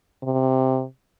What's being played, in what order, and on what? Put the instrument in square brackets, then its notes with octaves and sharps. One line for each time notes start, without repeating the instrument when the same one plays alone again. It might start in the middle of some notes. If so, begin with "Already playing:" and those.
[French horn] C3